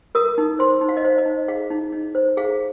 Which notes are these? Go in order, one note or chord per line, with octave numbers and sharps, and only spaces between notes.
A#4 D#6
D#4
C5 C6
D#4
F5
D#5
C5 F5
D#5
D#4
G#4 F5
D#4
D#4
C5
G#4 F5